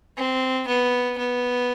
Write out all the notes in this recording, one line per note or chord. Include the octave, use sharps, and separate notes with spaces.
C4
B3
B3